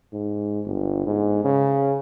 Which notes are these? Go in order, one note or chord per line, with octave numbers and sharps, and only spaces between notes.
G#2
G1
G#2
C#3